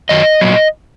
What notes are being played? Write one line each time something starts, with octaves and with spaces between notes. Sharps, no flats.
F#2 D#3 F#3 D#5
A#2 F#3